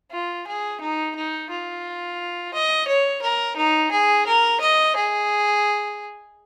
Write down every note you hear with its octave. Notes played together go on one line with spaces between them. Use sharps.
F4
G#4
D#4
D#4
F4
D#5
C#5
A#4
D#4
G#4
A#4
D#5
G#4